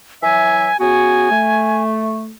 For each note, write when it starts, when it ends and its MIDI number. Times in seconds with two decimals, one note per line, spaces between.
0.23 0.69 52
0.23 0.69 54
0.23 0.69 76
0.23 0.77 80
0.80 1.29 49
0.80 1.29 59
0.80 1.29 66
0.80 1.83 80
1.31 2.34 57